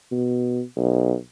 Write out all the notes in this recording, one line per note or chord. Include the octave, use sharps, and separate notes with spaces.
B2
B1